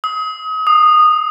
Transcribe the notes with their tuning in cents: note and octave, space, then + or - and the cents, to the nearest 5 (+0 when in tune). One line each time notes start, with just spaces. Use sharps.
D#6 +35
D#6 -15